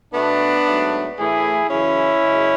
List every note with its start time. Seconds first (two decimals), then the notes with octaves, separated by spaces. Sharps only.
0.13 B2 A3 B3 D4
0.65 G#2 F#3 A3
1.18 A2 E3 A3 E4 G#4
1.69 F#2 C#3 E3 C#4 E4
2.21 F#2 C#3 G#3